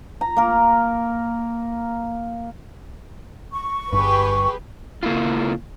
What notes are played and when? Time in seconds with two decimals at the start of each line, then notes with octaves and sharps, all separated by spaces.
0.21 A#5
0.37 A#3 A#4
3.53 C#6
3.93 G1 G2 G4 G#4 B4
5.03 C#3 A#3 E4 F4